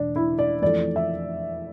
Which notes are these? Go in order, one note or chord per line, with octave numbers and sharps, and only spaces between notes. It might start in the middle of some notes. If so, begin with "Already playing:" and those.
Already playing: E1 D3 D4
E4
D5
F2 E3 A3 D5
E5